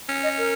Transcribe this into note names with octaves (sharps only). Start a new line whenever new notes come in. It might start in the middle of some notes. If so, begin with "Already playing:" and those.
C#4
D#5
A#4